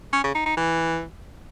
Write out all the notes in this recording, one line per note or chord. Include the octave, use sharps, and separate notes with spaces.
C#4
C#3
D#4
D#4
E3